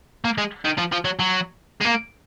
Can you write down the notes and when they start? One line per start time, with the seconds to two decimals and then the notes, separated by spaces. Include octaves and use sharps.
0.25 A#3
0.38 G#3
0.65 D#3
0.78 F3
0.92 F3
1.05 F#3
1.19 F#3
1.81 G#3
1.85 A#3